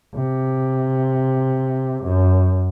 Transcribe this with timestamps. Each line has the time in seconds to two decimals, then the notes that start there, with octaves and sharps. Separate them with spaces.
0.15 C3
2.03 F#2